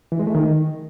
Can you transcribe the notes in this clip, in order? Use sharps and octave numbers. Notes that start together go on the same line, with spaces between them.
E3
G#3
A3
D#3